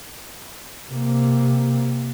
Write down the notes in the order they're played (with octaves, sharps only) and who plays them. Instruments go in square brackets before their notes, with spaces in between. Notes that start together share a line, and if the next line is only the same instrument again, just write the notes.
[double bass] C3 A#3